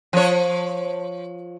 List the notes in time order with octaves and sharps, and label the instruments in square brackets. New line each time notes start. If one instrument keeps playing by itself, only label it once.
[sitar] F3 C#5